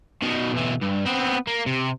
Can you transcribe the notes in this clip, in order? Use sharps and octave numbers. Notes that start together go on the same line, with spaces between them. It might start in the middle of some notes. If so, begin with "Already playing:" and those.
B2 D#3
B1 E3
G2
B3 C4
A#3
C3